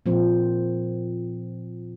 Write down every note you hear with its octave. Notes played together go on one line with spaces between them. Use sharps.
A#2 F3 C4